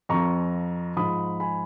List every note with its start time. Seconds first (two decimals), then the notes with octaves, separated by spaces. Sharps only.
0.09 F2 F3 A#5 C#6
0.96 G#2 F3 B5 D#6
1.40 G#5 B5